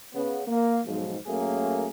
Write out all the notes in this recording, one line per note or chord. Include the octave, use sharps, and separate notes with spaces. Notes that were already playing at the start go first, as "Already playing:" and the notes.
C#3 B3
A#3
B1 G#2 F3
F#2 A3 A#3 C#4 G#4 A#4